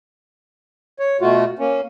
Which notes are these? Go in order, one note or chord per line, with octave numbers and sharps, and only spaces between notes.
C#5
B2 A3 F4 F#4
A#3 C#4